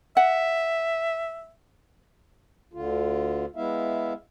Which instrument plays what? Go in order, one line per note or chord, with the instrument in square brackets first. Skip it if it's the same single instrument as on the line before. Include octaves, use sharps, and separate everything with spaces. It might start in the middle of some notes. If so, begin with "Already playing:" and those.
[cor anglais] E5 [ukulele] F#5
[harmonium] D2 D3 F4
G#3 B3 E4 E5 F5